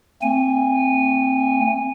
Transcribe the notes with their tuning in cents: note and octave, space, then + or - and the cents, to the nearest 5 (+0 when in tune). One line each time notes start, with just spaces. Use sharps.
A3 +35 C4 +0 G#5 -15